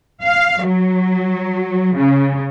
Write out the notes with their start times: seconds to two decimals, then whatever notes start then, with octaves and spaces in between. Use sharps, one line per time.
0.23 F5
0.66 F#3
1.97 C#3